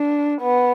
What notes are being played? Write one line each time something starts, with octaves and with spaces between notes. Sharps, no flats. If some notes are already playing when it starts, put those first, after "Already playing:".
Already playing: D4
B3